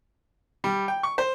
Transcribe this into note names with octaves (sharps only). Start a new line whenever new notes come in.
G3
G5
C#6
C5